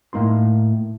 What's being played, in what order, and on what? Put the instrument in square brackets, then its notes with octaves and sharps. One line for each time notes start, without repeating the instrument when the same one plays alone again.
[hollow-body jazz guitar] A2 A#3 D#4 C6